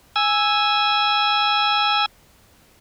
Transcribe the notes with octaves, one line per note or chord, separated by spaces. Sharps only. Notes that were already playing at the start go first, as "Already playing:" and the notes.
G#5 E6